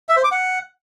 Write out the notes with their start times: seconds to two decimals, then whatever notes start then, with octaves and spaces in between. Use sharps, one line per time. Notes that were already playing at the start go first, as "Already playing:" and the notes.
0.09 E5
0.16 C5
0.24 D6
0.31 F#5